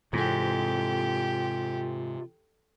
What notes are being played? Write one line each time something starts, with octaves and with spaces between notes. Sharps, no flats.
G#2 C3 E3 C4 F4 G4 A4